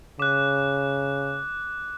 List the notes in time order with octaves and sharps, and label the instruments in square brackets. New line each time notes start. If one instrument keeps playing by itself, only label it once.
[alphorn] C#3 [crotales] D6 F#6